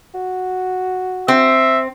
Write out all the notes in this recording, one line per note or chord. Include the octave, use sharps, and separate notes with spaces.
F#4
C4 E5